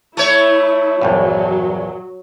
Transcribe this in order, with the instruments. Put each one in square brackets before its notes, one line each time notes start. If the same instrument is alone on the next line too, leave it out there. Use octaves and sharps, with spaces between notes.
[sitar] A3 C#5 [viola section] E4
[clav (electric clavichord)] A#1 E2 G2 [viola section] F#3